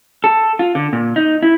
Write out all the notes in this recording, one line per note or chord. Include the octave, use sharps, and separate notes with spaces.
A4
F4
D3
A#2
D#4
E4